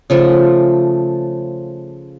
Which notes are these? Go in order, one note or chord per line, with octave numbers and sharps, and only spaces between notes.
C#3 F3 A3